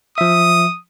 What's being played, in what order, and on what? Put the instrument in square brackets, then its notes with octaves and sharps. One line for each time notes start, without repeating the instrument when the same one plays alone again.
[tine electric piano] F3 E5 [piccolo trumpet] D#6